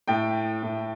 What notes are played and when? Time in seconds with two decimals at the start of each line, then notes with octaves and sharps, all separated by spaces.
0.07 A2 G5
0.63 A2